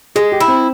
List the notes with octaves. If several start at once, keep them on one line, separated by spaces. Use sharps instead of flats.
G#3 G#4
G4
E4
C4